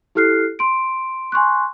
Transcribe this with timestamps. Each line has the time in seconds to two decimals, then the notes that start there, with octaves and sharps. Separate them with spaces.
0.15 E4 G4 A4 F6 F#6 C7
0.59 C6 D7
1.32 G#5 C6 C#6 F#6